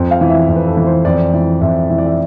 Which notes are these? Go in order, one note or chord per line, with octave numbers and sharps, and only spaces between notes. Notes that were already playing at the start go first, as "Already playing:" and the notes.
Already playing: F2
F5
E3
E5
F2
B4
A4
E3
C5
F2 D5
E3
F2 E5
E3 E5
D5
E5